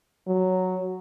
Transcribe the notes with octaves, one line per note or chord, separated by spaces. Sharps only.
F#3